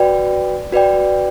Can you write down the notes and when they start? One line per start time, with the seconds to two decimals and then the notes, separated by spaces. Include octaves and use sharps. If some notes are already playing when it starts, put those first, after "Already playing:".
Already playing: F#4 B4 D5 G5
0.72 F#4 B4 D5 G5